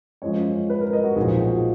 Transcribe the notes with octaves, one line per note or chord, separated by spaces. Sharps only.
F#2 F3 G#3 C#5
B4
A#4
D#5
F#4
B1 A#2 F3 G#4
F#4